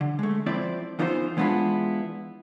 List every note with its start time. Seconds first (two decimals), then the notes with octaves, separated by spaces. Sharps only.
0.01 D3
0.19 G#3 A3
0.46 F3 C4 E4 D5
0.99 E2 E3 D#4 F4 B4 C5
1.37 E3 G#3 B3 D4 E4 F4